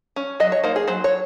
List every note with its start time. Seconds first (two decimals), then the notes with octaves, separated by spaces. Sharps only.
0.16 C#4
0.40 F#3 D#5
0.52 C#5
0.64 A#3 D#4 C5
0.76 G#4
0.88 F#3 C5
1.04 C#5